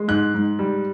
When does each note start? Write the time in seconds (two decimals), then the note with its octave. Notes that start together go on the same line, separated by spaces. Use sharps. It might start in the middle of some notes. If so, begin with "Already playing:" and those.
Already playing: G#3
0.08 G#2 F#6
0.34 G#2
0.59 G3